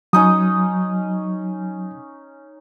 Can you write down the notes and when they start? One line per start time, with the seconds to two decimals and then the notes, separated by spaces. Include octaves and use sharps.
0.13 F#3 C#4 D#4 D#6